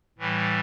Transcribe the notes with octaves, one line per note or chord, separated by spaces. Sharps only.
A2 E3 G3